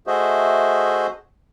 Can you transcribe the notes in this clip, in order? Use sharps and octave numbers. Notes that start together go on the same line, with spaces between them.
A3 F#4 G#4 C5 D#5 E5